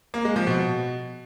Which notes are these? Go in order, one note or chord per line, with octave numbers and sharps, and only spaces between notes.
A#3
G#3
F3
B2